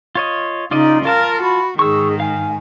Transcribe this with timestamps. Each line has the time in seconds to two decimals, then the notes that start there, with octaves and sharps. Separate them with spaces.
0.15 F4 C#5 D#5
0.71 C#3 D#4 F4 D5 D#5
1.05 F4 A#4 F5 A5 F6
1.43 F#4 B5
1.79 G#2 D#3 G#4 C#6 E6
2.20 F5 G#5